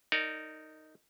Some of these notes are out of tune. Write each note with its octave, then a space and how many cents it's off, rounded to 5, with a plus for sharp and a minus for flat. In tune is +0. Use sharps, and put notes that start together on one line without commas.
D#4 +0 A#4 -25 D5 +0